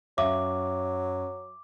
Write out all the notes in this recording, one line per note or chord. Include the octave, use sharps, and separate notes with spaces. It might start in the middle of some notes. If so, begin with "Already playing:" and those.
F#2 F#3 E5 F5 D6